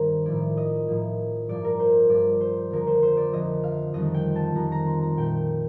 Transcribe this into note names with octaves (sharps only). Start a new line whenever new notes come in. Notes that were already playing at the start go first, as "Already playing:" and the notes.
Already playing: G2 D#3 A#3 A#4 C5
A2 F3 A#3 D5
D#5
A2 F3 A#3
G2 F3 A#3 D5
A#4
C5
G2 F3 A#3 D5
C5
F2 D3 F3 A#3 A#4
C5
C5
D5
F2 D3 F3 A#3 D#5
F5
F2 D#3 G3 D#5
G5
A5
F2 D#3 G3 A#5
A#5
C6
A#5
A#2 A3 G5